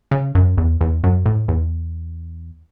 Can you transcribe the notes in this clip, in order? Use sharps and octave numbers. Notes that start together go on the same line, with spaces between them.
C#3
F#2
E2
E2
F#2
A2
E2